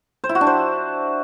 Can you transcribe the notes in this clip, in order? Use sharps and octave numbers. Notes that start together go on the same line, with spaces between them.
C5
E4
F#4
D4
C5